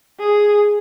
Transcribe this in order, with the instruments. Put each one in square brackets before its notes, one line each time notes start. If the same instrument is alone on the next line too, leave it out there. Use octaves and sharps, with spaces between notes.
[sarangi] G#4